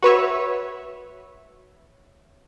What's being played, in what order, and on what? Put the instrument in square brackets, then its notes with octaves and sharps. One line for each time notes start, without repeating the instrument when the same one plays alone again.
[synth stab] F#4 B4 C#5 E5